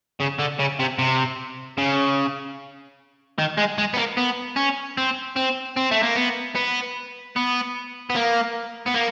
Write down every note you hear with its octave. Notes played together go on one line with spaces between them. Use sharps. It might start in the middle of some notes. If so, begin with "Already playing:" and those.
C#3
D3
C#3
C3
C3
C#3
D#3
G#3
G#3
B3
A#3
B3
C#4
C4
C4
C4
A3
A#3
B3
B3
B3
B3
A#3
B3
A#3